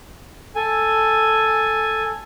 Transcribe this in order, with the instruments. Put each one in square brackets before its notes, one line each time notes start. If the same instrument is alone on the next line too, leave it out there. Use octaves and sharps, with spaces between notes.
[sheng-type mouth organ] A4 G#5